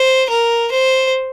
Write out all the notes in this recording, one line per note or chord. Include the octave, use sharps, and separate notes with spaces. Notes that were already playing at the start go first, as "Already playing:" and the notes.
Already playing: C5
A#4
C5